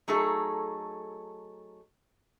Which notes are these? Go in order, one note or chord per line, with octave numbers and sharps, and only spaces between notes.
F#3 A3 D#4 G#4 A4